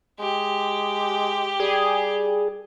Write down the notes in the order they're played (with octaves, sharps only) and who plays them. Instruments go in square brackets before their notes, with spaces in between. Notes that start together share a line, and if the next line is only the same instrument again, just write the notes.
[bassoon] G#3 [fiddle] G4
[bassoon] G3 [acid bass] G#4